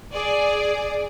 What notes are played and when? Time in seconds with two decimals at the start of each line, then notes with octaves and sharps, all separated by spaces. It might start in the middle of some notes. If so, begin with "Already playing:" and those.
0.12 G#4 D5